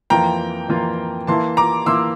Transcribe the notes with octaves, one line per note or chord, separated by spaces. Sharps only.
F2 E3 A#3 F4 G5 A#5
F2 E3 A#3 F4
E3 A#3 E4 A5 C6
A#5 D6
E3 A#3 E4 C6 E6